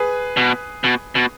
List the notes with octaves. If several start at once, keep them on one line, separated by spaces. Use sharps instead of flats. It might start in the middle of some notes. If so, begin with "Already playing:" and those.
Already playing: G#4 B4
B2
B2
B2